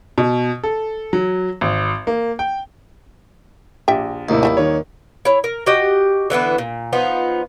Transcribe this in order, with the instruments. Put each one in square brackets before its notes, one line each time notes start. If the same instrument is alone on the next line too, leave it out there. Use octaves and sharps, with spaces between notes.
[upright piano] B2
A4
F#3
G#1
A#3
G5
[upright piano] A#1 [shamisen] G4 E5 G5
[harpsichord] D#2 [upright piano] A2 C3 E4
[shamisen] F3 G3 G#3 [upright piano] E4
[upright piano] D#3 C#5
[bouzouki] E4 C#5
A#4
F#4 G4 D#5
D3 E3 B3 E4
A#2
F3 B3 D#4 F4